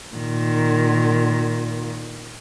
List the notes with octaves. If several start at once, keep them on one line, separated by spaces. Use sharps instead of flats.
A#2 D#3